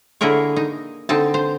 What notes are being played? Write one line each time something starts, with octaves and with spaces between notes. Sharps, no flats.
D3 A#3 E4 G#4 A#4 C#5
D#4
D3 C4 D#4 A5
C5